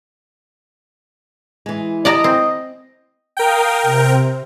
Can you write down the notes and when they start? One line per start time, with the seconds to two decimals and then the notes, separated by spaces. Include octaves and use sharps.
1.66 E3 G#3
2.05 D5 D#5 A5 A#5
2.24 C4
3.37 A#4 F5 G5 D#6
3.83 C3 C4